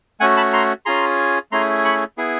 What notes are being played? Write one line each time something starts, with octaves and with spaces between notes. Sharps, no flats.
A3 C#4 F#4 F#5 G#5
A5 B5
A#5 C6
C#4 F4 G#4 A#5 C6
A3 C#4 E4 G#4 A#5 C6
B5 C#6
B3 E4 G#4